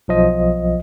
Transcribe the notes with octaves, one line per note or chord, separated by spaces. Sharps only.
B1 F3 D#5